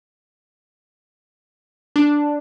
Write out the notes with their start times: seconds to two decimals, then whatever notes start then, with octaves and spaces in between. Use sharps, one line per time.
1.96 D4